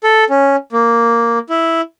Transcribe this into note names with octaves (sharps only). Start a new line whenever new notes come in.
A4
C#4
A#3
E4